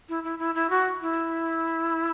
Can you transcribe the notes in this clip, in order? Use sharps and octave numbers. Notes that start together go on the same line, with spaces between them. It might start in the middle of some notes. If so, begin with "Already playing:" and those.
E4
E4
E4
E4
F#4
E4